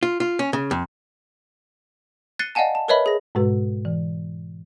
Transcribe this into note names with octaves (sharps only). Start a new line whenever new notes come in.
F4
F4
C#4
C#3
F2
F#6 A6 C7 C#7 D#7 G7
D5 D#5 F5 F#5 G#5 A5
A5
A#4 B4 C#5 D#5 E5 B5
G#4 A#6
G#2 B2 G#3 F#4 B4
E3